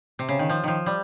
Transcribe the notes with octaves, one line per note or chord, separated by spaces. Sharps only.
C3
C#3
D#3
F3
D#3 F3
G3